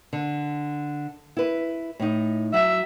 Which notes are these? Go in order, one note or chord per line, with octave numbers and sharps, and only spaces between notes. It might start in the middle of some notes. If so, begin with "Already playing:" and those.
D3
E4 B4
A2 D#4
F#3 E5